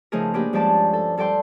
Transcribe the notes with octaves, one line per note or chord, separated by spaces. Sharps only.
C#3 F3 A3 D#4 G#4 A#4
A#3 D4 G4 G#4 B4
G2 F3 G#3 C#4 D5 A5
A4
G2 A4 D5 G5 C6